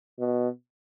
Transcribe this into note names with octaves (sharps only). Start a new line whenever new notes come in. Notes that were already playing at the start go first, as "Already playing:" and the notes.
B2